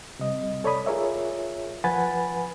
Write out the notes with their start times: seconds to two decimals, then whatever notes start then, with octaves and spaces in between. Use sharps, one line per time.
0.19 C3 G3 D#5
0.64 A4 C#5 D5 B5 D#6
0.86 F4 G#4 A#4 C#5 E5
1.84 F3 B4 F#5 G#5 B5 A6